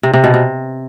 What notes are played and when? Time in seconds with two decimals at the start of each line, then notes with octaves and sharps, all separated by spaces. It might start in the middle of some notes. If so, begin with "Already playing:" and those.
0.03 C3
0.13 C3
0.24 B2
0.34 C3